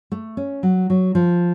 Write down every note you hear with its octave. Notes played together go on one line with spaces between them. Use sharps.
A3
C#4
F#3
F#3
F3